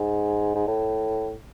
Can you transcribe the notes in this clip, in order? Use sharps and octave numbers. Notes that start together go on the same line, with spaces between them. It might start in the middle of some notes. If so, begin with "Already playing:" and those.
Already playing: G#2
G#2
A2